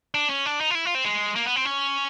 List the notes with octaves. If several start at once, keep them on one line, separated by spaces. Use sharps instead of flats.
D4
C#4
D4
D#4
F4
E4
F4
C4
G#3
A#3
B3
C4
C#4